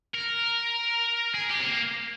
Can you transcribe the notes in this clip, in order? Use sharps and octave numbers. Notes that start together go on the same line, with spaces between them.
A#4
G#4
G4
C4
A#3